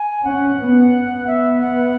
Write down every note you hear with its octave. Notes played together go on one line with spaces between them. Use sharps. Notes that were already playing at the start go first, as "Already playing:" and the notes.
Already playing: G#5
C#4 F#5
B3
B3 E5
F#5